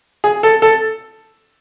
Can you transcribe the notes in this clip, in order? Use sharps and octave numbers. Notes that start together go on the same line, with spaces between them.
G#4
A4
A4